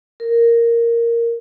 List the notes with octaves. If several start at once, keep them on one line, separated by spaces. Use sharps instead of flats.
A#4